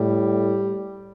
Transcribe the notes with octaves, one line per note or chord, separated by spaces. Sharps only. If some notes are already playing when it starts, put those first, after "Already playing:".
Already playing: A2 G3